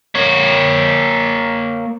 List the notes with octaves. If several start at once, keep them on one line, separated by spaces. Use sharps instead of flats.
A#3 C#5